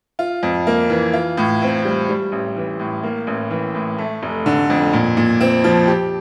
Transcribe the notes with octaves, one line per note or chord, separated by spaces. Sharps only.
F4
F2
A#3
E3
F4
A2
C4
G3
G3
A1
E3
A2
A#3
A1
E3
A2
A3
F1
D3
F2
A#2
A#2
C4
F3
G4